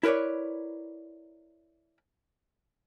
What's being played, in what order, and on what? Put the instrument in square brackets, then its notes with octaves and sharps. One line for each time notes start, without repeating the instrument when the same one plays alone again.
[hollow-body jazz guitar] E4 A#4 B4 C#5 D5